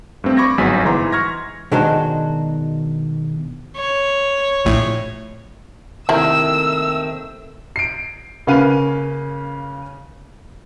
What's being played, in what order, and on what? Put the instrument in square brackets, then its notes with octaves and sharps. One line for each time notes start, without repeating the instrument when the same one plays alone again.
[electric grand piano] G2 A3 C4
B5 C#6 D6 G#6 A#6
G1 G#2 F#3 B3 G#5 B6
G#2 E3 A#5 C6
C6 C#6 F6 G#6 A#6
[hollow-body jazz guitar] B2 D#3 G#3 D4 F#4 C5
[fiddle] C#5
[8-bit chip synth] A#1 A2
[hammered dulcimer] C3 A3 A#3 [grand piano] D#3 [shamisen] E4 A#4 [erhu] E6
[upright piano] C7 D7
C#3 A#3 C#4 B4 F5 D#7